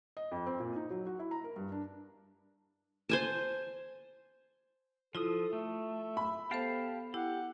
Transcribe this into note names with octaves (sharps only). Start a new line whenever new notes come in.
D#5
F2
C4
A#2
D#4
F#3
F#4
E4
A#5
A#4
G2
D4
C5 G#5 A5
F3 E4 F4 A4 D#6
A3 E5
B5
B3 G4 A4 C5 F5 A5
E4 G4 F#5